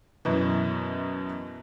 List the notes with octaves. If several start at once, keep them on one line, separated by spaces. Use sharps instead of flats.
F#2 B2 E3